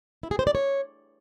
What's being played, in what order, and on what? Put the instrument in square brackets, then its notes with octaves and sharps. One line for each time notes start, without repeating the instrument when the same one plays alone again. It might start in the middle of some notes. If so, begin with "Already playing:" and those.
[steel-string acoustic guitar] E4
G#4
C5
D5
C#5